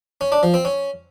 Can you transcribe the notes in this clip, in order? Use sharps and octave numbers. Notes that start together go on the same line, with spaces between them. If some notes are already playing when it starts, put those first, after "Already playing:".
C#4
D4
F3
C4
C#4